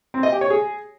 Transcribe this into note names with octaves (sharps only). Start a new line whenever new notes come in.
C4
D#5
G4
C#5
G#4